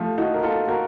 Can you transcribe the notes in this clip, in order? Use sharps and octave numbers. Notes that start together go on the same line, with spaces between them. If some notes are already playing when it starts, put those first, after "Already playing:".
Already playing: F3 A3
D#4 F#4
A#4
F4 A4
F#4 A#4